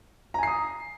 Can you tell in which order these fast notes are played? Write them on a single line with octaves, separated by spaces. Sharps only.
A#5 G#5 C7 D#6